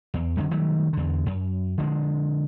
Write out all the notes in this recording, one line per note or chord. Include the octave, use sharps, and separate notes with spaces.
E2
F2 D3 F#3
D#3 F#3 G3 A3
E2 D3
F#2
D3 F3 G3 G#3